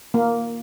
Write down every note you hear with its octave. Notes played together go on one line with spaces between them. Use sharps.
A#3